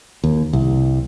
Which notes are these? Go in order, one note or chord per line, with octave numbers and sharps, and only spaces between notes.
D#2
C2